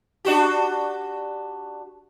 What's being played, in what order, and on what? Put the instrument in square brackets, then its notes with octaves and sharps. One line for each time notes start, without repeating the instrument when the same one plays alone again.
[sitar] D4 F#4 G4